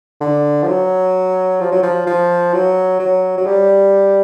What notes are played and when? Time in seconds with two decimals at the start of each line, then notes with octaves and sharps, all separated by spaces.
0.21 D3
0.63 F3
0.67 F#3
1.61 F3
1.72 F#3
1.83 F3
2.07 F3
2.53 F#3
2.99 F#3
3.37 F#3
3.46 G3